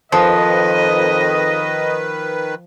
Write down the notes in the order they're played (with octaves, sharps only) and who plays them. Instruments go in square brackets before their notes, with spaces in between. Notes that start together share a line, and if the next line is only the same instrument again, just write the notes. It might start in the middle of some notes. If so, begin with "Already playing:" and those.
[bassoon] F2 [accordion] D#3 B4 [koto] F3 [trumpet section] D#5